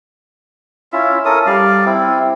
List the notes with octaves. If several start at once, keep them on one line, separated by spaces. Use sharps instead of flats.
C#4 E4 F4 E5
C#4 A4 A#4 D#6
G3 D5 F5
C4 E4